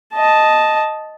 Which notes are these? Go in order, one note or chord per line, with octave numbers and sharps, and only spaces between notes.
D#5 A5